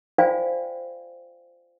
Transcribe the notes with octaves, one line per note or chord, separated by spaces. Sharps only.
F4 C5 D5 F5 G5 G#5